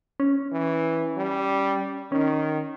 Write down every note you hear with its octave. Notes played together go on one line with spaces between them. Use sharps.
C#4
E3
G3
D#3 C#4